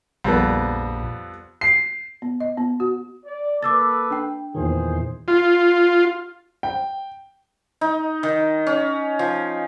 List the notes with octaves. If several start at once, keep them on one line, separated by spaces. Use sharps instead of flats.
A#1 F2 G3 B3
C7
B3
D#5
B3
F#4
D5
A#3 A4 B4 D6 E6 A6
D4 G5
E2 A#2 D#3 E3 G#4 C5
F4
G5
D#4
D#3
C#4
F3